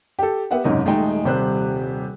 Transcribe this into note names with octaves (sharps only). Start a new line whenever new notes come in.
G4 A4
B3 G4 E5 F#5
F#1 G#2 C3 C#4 D#5
D#1 G#3 A3 D#4 G5
D#1 C3 G3 C5 F#6